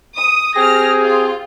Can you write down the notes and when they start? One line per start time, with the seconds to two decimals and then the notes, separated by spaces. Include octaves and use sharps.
0.16 D#6
0.55 C4 G4 G#4 F6 A#6
1.03 F4